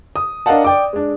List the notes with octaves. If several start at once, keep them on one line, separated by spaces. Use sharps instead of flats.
D#6
D4 A#4 D#5 F5 F#5 A5
D5 G5 D6
G#3 D4